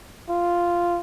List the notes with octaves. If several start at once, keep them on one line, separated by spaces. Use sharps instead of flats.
F4